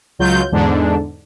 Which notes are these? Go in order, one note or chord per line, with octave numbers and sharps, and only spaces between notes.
C#2 F#3 F4 G6
E2 G#2 D3 D4